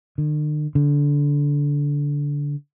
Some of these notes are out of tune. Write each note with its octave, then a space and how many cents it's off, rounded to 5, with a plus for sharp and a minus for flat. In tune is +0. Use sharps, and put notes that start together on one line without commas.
D3 +45
D3 -20